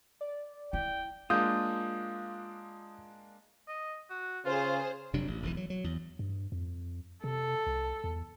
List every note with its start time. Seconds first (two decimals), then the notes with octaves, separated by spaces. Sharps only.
0.21 D5
0.73 E4 G5
1.30 G#3 A#3 D4 F4 D#6 G6
3.68 D#5
4.10 F#4
4.45 C#3 F4 G#4 C5
5.13 F1 C3 F#3 D4
5.28 A1
5.42 E1 B1 A#2 E3
5.57 F#3
5.70 F#3
5.84 E2
6.19 G2
6.52 F2
7.24 C3 A4
7.67 C2
8.04 E2